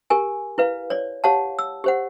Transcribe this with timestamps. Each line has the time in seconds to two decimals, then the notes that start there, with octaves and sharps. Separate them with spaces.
0.10 G4 A#4 G#5
0.58 E4 B4 F5
0.90 C#5 D5
1.24 G4 C#5 F5 F#5 A5
1.59 E6
1.84 G4 C5 F#5